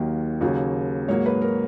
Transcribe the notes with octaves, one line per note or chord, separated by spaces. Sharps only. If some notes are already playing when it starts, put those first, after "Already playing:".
Already playing: D#2 D#3 F#3 A#3
D#2 C#3 F#3 A#3
G#2 F#3 A#3 C#5
B4
A#4